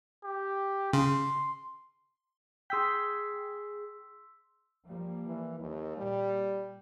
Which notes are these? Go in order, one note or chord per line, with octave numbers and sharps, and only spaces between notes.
G4
C#3 C6
G#4 G5 C6 E6 B6
F3 G3 A#3
E3
D#2
A#2 G3